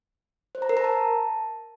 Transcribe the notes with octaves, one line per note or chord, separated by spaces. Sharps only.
C5
A#5
A#4
A#5
A5